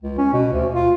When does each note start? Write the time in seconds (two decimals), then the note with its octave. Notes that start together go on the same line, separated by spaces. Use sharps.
0.03 C#2
0.18 C#4
0.33 B2
0.53 D2
0.75 F4